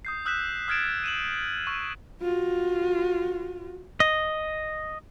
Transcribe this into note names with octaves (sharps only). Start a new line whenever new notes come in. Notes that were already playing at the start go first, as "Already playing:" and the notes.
D#6 G6 C7
D#6 E6 F#6 G6 B6 E7
D#6 F6 G#6 A6 D7 E7
D#7 E7 F#7
C#6 E6
F4 F#4
D#5